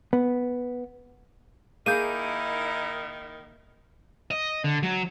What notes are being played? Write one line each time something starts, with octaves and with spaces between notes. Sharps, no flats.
B3
D#3 A#3 D#4 E4 G#4 G6 D#7
D#5
D3
F#3